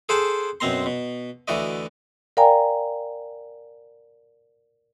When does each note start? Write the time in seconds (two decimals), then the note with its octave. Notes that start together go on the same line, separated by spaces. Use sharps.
0.09 G#4 A4 C5 F#5 G5 A5
0.60 F#2 B2 C4 A#5 C6
0.86 B2
1.48 D2 E3 F#4 D5 D#5
2.37 A#4 D5 F5 G5 G#5 A#5